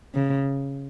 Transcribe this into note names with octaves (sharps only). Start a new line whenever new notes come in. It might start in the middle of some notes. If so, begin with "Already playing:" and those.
C#3